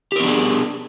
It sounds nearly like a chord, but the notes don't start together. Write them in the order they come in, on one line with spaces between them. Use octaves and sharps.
G4 A#4 B3 D4 G#4